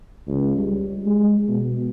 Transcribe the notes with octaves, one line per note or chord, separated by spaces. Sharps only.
C#2
G3
G#3
B2